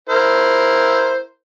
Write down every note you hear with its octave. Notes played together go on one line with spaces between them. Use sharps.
E4 A#4 C5